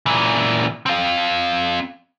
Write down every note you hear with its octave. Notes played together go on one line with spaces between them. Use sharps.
A#2 E3
C4 F5